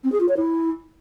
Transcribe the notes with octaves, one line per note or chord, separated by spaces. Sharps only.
C4
G#4
F4
C#5
E4